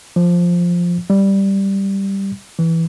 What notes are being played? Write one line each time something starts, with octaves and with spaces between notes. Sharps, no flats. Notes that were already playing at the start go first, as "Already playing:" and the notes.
F3
G3
E3